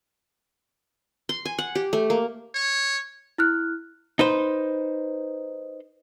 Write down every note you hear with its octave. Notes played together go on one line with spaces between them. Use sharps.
C6
G#5
F#5
G4
A3
A#3
C#5
E4 F6 F#6
D#4 B4 C5